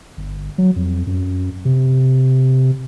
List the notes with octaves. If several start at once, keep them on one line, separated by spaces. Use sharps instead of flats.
G1
F#3
F2
F#2
C3